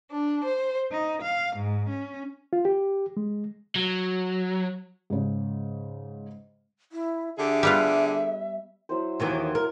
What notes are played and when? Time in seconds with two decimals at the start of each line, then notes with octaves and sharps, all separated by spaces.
0.12 D4
0.45 C5
0.91 D#4
1.22 F5
1.55 G#2
1.88 C#4
2.53 F4
2.65 G4
3.17 G#3
3.76 F#3
5.10 G#2 C#3
6.92 E4
7.37 D3 G4 G#4 E5
7.63 G3 B3 F4
8.89 F#3 E4 C5
9.20 D#2 D#3 E3
9.55 A#4